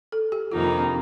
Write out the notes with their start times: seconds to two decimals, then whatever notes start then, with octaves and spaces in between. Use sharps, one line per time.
0.12 A4
0.32 G4
0.52 F2 C3 D#3 A#3 D#4 F4
0.65 D4
0.78 C4